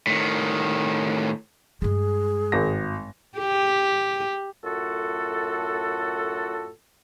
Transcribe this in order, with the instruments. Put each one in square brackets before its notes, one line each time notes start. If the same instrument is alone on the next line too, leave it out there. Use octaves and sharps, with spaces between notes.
[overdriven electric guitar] A2 D#3
[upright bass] G2 G#3 [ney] G#4
[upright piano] G#1 A#6
[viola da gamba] G4
[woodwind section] F#2 A2 F4 F#4 A4